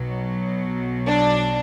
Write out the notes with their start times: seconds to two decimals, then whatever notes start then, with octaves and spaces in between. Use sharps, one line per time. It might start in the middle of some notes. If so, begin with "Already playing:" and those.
Already playing: B1 B2 F#3
1.08 D4